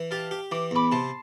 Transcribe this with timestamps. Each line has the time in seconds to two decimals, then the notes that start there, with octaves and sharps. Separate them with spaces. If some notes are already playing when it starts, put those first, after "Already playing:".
Already playing: E3
0.11 G4 F5 A5
0.31 G4
0.52 E3 D6
0.71 E2 B5 D6
0.92 C3 A5 C6